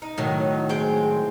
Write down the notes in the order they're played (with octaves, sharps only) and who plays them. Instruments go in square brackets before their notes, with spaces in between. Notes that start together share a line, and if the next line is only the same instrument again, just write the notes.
[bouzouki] D#4
[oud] A2 D#3 F#3
[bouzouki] G#3 C4 G5